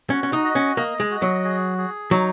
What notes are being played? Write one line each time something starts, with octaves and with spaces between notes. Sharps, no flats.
C#4 F#4
C#4
D#4
D#5
C#4
A#3 D#5
G#3
F#4
F#3
G#4
G#4
F#3 D#4